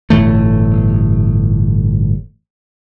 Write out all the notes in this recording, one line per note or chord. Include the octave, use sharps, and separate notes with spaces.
G1 A2 E3 A3